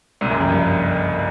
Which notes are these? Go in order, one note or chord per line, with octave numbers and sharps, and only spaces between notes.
C2 C3
F#1 F#2
F2
G2